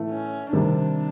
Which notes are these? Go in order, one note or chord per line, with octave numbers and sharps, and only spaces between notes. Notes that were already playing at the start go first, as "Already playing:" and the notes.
Already playing: A2 E3 A3
C#4
C3 D#3 G3 C4 D4